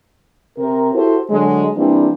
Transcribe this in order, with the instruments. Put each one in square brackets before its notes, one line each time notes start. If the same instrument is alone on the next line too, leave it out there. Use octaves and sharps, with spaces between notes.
[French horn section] C3 A#4
E4 F#4 G4 A4 C5
D3 F#3 G#3
E3 G3 A#3 C4 D4